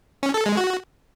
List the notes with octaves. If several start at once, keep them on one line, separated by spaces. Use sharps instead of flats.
C#4
A4
G#3
F#4